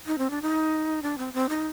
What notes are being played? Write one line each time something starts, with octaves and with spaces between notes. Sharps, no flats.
D#4
C4
D4
D#4
D4
C4
C4
D#4